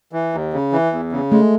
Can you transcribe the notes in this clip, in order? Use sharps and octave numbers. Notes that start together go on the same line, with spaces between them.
E3
D#2
C#3
E3
E2
C#3
G#3 A3